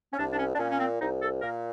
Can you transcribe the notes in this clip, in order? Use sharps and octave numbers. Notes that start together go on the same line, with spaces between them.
C#4
C2 D4
D4
C#4
D4
A#2 C#4
C#4
C4
C2 D#4
A4
A#2 A#4